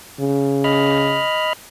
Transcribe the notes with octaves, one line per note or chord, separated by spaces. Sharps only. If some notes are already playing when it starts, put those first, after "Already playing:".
C#3
D#5 B5 F6